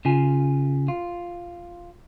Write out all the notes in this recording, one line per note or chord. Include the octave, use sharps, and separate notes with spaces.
C#3 F4 G#5
F4